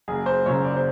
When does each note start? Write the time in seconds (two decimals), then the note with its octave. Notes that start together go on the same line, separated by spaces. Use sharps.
0.08 F#1 G#4
0.26 C5
0.46 F#2 C#3 C#5
0.64 D5
0.76 C5